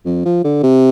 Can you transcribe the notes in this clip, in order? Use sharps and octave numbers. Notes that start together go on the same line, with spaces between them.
F2
F3
D3
C3